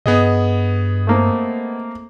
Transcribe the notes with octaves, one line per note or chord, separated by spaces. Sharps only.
G2 B3 G#4 D#5
A3 A#3 C4